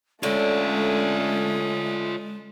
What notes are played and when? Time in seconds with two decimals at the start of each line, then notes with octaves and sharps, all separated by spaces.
0.23 D3 G#3 A3 C#4 F4 C#5